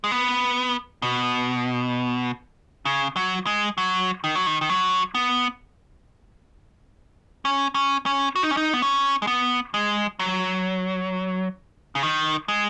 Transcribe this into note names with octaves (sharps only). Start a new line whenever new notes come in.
G#3
B3
B2
C#3
F#3
G#3
F#3
D#3
F#3
D#3
D#3
F#3
B3
C#4
C#4
C#4
F#4
D#4
C#4
D#4
B3
C#4
G#3
B3
G#3
F#3
C#3
D#3
G#3